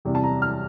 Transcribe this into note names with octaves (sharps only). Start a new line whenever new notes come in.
E2 C3 G3 C4
A5
A#5
F6